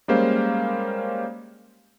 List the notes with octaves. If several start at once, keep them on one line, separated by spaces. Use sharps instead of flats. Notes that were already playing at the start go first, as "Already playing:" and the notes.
G3 G#3 A#3 C#4 C5 F5